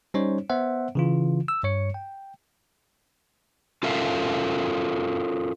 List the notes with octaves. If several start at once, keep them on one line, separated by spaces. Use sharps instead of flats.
G3 C#4 D#4 C5 C#5
B3 C5 E5 F#5
C#3 E3 F4
E6
G2 C#5 C#7
G5
C#4 F4 A4 A#4 E5 F5